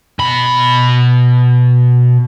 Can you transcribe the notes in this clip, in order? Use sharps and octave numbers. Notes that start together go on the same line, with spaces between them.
B2 B5